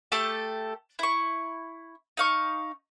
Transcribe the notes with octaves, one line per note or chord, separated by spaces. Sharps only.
A3 G4 A4 A5
E4 C#6
D#4 F5 C#6